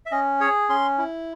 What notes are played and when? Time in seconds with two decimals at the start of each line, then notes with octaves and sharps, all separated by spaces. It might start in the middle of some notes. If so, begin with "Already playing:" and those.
0.06 E5
0.11 C#4 D#5
0.40 G#4 C#5
0.69 C#4 C6
0.98 E4